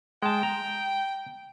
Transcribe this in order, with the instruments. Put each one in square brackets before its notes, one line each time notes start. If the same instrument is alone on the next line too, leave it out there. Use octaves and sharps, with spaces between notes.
[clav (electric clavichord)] G#3 A5 [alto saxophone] G5
[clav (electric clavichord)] A#5